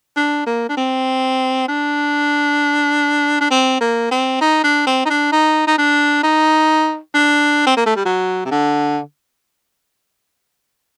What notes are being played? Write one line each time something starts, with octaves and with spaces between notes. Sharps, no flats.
D4
A#3
D4
C4
D4
D4
C4
A#3
C4
D#4
D4
C4
D#4
D4
D#4
D#4
D4
D#4
D4
C4
A#3
A3
G3
F#3
C3
D3